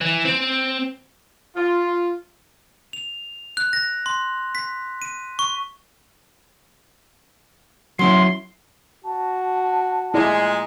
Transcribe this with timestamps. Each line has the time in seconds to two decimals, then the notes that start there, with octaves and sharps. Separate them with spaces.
0.01 E3
0.25 C4
1.56 F4
2.93 F7
3.57 F#6
3.73 A#6
4.06 C6
4.55 B6
5.02 D#7
5.39 C#6
7.99 F#3 C#4 E4 C6
9.05 F#4 A5
10.14 A#2 F3 G#3 E4 D5